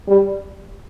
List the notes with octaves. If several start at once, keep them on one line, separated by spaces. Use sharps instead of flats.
G3